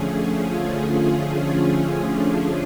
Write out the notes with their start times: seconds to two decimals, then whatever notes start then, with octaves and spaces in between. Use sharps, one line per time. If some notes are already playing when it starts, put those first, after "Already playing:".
Already playing: D3 F3 A3 C#4 G#4
0.44 F4
2.11 D4